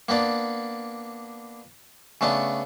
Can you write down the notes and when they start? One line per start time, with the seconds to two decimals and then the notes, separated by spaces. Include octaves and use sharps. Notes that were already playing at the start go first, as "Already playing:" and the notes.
0.09 A#3 B3 D4 D5
2.21 C#3 A3 B3 D4